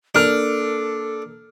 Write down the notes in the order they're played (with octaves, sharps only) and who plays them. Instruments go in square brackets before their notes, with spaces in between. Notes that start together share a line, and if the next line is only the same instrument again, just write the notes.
[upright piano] A#3 F6 F7 [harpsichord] D4 [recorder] A4